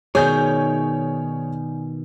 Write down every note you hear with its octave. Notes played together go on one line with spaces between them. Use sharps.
B2 D#3 D#4 G#4 C#5 D5 G#5 G6